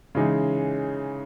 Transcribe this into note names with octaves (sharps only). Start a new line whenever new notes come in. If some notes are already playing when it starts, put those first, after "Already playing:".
C#3 E3 G#3 D#4